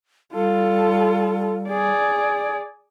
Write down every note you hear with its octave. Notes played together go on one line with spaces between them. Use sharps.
G3 F4 A4
G#4 D5